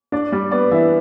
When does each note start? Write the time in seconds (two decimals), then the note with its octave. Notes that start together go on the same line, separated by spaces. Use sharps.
0.12 D4 D5
0.32 G3 D5
0.51 B3 D5
0.71 E3 E5